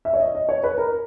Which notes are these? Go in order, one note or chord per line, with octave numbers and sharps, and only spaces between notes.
E5
C#5
D#5
D#5
C#5
B4
A#4